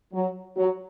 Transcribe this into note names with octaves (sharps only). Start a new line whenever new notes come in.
F#3
F#3